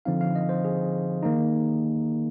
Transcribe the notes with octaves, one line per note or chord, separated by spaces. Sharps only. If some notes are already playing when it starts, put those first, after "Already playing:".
D3 F3 C4 D#4 F5
F5
D#5
C5
G#4
D#3 A#3 D#4